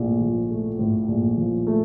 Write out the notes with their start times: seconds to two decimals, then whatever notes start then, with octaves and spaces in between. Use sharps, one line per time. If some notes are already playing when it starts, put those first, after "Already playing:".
Already playing: A#1 A2
0.21 F3
0.50 A3
0.79 A2
1.08 A#1
1.37 F3
1.67 A3